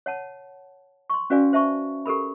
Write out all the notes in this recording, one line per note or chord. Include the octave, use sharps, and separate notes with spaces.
C#5 F#5 A5
C6 C#6
C#4 F#4 B4 D5 F5 G#5
C5 E5 A5 C#6
G4 A4 A#4 B5